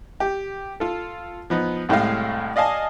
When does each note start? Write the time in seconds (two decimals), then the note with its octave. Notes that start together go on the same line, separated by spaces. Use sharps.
0.20 G4
0.80 F4 A4
1.50 F3 B3 D#4
1.89 C2 A2 G#3 A3 F5
2.56 D5 D#5 F5 G#5 A5